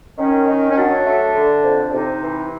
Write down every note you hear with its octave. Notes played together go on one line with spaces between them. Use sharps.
D#3 C#4
D#3
C#4
F#3 D4
A3
D3
F2
D4
C3 D#4
E3